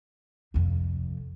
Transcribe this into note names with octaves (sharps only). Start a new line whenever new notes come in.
F2 C3